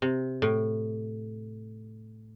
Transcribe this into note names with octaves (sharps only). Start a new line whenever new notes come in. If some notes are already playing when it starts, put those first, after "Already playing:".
C3
A2